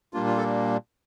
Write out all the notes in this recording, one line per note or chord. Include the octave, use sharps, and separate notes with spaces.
A#2 G3 A#3 D4 F4
F4
A4